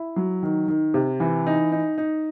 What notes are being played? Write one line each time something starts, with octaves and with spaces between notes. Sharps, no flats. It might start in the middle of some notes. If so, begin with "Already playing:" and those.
Already playing: E4
F#3
D#3
D#3
C3
E3
D#4
D#4
D#4